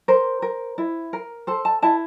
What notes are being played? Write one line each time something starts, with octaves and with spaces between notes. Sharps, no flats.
A#4 C5
A#4
E4
A#4
A4 C5
A5
E4 A5